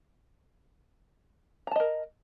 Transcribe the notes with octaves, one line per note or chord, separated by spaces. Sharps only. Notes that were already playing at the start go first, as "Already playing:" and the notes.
A#4 D#5 A5 A#5